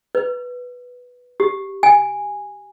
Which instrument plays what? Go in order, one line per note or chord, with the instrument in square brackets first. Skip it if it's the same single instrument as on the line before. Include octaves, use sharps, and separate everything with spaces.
[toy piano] B4
G4
G#5